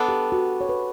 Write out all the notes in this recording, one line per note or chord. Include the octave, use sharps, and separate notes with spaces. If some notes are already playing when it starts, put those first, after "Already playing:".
Already playing: B3 D4 A4
G4
F#4
C#5
B4